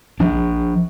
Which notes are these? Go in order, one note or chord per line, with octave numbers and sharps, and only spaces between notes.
F3 D4